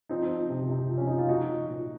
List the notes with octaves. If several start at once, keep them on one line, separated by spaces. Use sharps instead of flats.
F3 C4 D#4
F3
C3
C3
F3
C#4
F3 D#4
F4
F3 D#4 F#4
F3
A#2